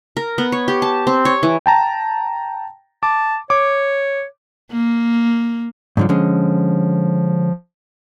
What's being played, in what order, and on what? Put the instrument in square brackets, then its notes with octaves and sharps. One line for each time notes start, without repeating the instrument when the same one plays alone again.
[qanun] A#4
B3
C#5
G4
A5
C4
C#5
E3
[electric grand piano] G5 A5 A#5
[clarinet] A5 [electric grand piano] D6
[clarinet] C#5 [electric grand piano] D6
[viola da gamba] A#3
[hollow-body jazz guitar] G#2 D3 F3 [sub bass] F#3
[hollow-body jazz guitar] D3 G#3 C#4 [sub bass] F3